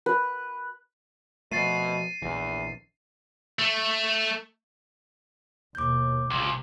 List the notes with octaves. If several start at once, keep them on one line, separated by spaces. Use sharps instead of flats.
B4
B2 F3 A3 A6 C7 D#7
A#1 E2 E3
A3
D#2 B2 D6 G6
G#1 C#2 C3